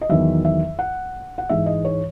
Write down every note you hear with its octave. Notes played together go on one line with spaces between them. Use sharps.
D#5
E2 D#3 F#3 E5
E5
F#5
F#5
G#2 E3 G#3 E5
D#5
C#5